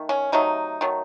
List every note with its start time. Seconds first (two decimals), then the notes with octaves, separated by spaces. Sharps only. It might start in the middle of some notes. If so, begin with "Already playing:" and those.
Already playing: D#3 A3
0.09 C#4
0.32 C3 F#3 A3 D#4
0.81 D#3 F#3 A3